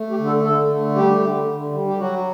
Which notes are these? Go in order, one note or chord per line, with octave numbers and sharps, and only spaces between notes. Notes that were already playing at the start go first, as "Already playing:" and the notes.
Already playing: A3
G4
D3
A4
D3 A4
A3
G3 G4
D3
D3
G3
G4
F#3 F#4